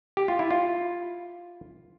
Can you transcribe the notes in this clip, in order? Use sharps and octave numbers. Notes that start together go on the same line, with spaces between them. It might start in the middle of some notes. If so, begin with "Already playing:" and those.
G4
F4
E4
F4